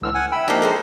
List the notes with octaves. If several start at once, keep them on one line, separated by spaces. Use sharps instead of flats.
C#2 A2 D3 E3 E6 F6
F#5 G#5
E5 G5 B5 E6
F3 A#3 D4 D#4 F#4 G4
G#3 A4 A#4 C5